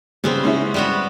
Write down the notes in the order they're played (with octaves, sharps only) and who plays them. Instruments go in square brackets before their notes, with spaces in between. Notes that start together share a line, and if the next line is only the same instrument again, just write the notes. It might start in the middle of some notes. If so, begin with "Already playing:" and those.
[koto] C#3 B3 C4 [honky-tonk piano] G3
[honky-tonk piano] G#3 C#4 E4
[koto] G3 B3 F#4